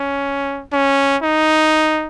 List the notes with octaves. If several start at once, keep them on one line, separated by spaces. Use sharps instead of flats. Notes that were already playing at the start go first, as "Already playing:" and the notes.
Already playing: C#4
C#4
D#4